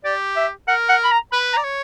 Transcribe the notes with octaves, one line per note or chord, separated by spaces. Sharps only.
G4 D5
E5
A#4 F#5
F#5
B5
A#5
B4 B5
A#5
D5
C#5